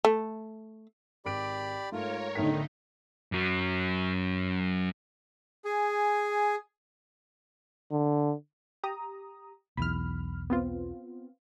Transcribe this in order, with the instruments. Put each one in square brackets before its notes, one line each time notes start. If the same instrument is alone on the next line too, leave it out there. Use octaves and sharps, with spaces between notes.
[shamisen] A3
[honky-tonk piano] G#1 D7 [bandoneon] G4 D5 B5
[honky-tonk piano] G#2 A3 [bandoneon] F4 [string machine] A#4 C#5
[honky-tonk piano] B1 A2 B6 [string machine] D3 D#4 [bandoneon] D#3
[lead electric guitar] F#2 F#3
[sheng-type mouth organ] G#4 G#5
[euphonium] D3
[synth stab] G4 A#5 D#6
[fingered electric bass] B1 E2 [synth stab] B5 F6
[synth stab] B3 C4 F4